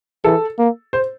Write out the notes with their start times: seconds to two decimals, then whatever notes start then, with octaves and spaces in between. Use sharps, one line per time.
0.24 E3 A4
0.58 A#3
0.93 C5